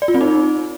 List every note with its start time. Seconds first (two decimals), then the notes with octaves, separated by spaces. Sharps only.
0.02 D5
0.08 F4
0.14 C4
0.21 D#4